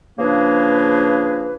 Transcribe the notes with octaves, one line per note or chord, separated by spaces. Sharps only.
C#3 F3 A#3 D4 G#4 B4